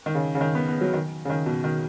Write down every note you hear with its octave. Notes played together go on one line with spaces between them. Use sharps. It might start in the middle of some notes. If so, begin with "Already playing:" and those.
D#3
C#3
C#3
D#3
B3
B3
F#3
D#3
C#3
D#3
B2
D#3